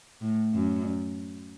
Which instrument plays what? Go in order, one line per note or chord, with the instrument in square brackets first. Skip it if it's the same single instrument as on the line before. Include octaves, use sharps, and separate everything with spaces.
[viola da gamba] A2
F#2